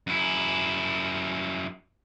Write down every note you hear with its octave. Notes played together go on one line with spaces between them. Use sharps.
F#2 E4